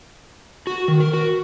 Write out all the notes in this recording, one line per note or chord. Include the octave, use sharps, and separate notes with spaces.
F#4
D#3
A#4
F#4